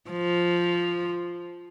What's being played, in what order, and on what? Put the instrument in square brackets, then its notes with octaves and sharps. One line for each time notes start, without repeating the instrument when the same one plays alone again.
[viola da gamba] F3